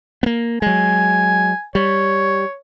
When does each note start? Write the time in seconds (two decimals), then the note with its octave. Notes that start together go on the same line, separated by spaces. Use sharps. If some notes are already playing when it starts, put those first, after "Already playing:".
0.23 A#3 B3
0.62 F#3 G#3 G#5
1.75 G3 C#5